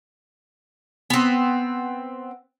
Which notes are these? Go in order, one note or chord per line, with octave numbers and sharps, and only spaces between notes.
B3 C4